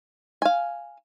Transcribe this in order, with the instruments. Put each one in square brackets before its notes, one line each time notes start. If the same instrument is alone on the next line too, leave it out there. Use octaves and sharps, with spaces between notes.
[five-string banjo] F5 G#5